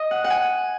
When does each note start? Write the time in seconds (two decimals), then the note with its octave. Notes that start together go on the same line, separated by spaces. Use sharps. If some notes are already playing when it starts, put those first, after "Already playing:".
Already playing: D#5
0.11 F#5
0.24 F#5
0.30 G#5